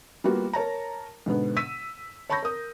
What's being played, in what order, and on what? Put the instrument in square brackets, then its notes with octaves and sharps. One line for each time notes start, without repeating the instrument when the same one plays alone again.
[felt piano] G3 A#3 B3 F4 F#4
A#4 C#5 A5 A#5
G#2 B2 D3 B3
E6 B6 D#7
C#5 A5 B5 C#6 G6 A#6
A#4 D#6